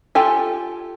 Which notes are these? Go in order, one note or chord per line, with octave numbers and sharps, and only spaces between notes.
F4 G4 A4 G#5